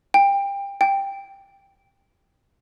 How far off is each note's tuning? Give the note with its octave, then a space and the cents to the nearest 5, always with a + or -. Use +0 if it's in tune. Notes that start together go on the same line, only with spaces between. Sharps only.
G5 +25
G5 +10